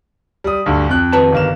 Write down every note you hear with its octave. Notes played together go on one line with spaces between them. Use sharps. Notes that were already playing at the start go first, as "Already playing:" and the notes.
G3 D#6
D2 G2 D3
F2 F#6
D#2 B4 A5
G1 A#3 E7